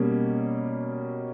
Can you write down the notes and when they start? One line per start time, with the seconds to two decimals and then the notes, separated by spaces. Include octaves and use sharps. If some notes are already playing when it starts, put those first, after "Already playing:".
Already playing: B2 G3 A#3 C#4